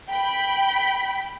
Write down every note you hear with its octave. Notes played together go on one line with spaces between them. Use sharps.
G5 B5